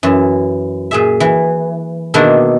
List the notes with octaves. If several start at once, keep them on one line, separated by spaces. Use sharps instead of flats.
F#2 E3
A#2 G#4 E5
E3
B2 D#3 A#3 D4 E4